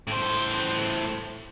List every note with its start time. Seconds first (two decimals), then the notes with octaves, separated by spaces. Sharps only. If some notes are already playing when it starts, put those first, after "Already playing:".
0.07 A2 C5